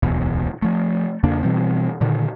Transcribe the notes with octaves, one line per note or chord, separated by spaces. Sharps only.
D1 B1 E2 B2
F3 A3
E2 C#3 A#3 D4
B2 E3 G3 C4
A#2 D3 D#3